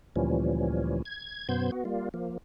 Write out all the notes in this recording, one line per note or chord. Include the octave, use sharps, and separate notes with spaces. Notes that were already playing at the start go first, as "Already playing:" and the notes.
D2 A#2 E3 F3 G3 C#4
G#6
F#2 B2 B3 C5 G6 G#6
B3 F#4
G3 A#3 F4
F3 A#3